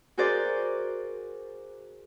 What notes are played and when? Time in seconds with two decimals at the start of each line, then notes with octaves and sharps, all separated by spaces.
0.18 F#4 G#4 A#4 C5 D5